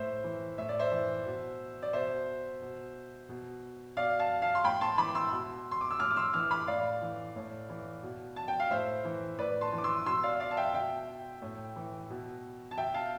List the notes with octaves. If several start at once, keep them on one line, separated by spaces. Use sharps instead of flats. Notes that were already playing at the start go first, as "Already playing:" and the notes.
Already playing: A2 C5 E5
E3
A2 E5
D5
C5 E5
E3
B2
D5
B2 C5 E5
B2
B2
B2 D5 F5
F5 A5
F5 A5
C6
A2 G5 B5
A5 C6
E3 B5 D6
C6 E6
B2
C6
D6
E6
A2 D6 F6
D6
C6 E6
E3 D6 F6
B5 D6
A2 D5 F5
E3
A2
E3
B2
A5
G5
F5
A2 C5 E5
E3
A2 B4 D5
A5 C6
E3
D6
C6 E6
B2 C6 E6
D5 F5
D5 F5
A5
E5 G5
B2 E5 G5
A2
E3
B2
A5
B2 E5 G5
F5 A5